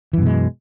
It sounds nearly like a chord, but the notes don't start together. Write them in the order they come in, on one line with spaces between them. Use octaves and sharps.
E3 F#2 B2 G#3